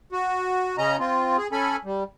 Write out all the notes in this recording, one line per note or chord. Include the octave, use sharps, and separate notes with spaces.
F#4
C#3 C#4 D#5 A#5
C4 F4
G#4
C#4 A4 G#5 B5
G3